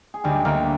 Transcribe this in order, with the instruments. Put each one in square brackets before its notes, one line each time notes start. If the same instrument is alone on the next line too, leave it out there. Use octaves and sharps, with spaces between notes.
[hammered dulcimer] G#4
[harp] D2 [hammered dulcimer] G3 G4
[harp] D2 [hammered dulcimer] A#3 A#4